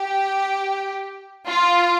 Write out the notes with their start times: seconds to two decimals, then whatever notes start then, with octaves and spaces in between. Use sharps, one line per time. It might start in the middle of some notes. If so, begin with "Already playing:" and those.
Already playing: G4
1.46 F4